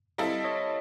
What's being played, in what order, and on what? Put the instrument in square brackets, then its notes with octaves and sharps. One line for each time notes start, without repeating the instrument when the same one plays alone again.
[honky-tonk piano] G3 C4 E4 A4 [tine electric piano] D#5 F5
[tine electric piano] C#5 D#5